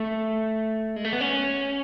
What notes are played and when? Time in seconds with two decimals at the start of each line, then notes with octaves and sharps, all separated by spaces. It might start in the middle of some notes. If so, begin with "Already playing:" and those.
Already playing: A3
0.96 G#3
1.05 A3
1.13 B3
1.21 C#4